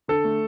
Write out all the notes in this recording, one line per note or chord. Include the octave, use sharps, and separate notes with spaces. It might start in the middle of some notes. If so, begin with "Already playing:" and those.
D3 A4
A3